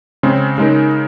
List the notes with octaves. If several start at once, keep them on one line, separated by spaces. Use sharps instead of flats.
C#3 G#3 C4
C#3 G#3 D#4 A#4